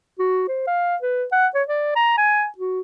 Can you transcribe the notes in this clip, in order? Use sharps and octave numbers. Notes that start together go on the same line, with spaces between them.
F#4
C5
F5
B4
F#5
C#5
D5
A#5
G#5
F#4